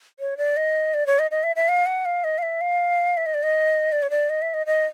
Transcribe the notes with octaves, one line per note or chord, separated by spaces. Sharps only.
C#5
D5
D#5
D5
C#5
D#5
D#5
E5
E5
F5
F#5
F5
D#5
F5
E5
F5
E5
D#5
D5
D#5
D5
C#5
D5
D#5
E5
D#5
D#5